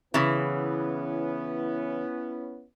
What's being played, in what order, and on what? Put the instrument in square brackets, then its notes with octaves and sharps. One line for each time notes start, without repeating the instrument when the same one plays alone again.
[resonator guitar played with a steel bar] C#3 E3 [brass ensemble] B3 C#4 E4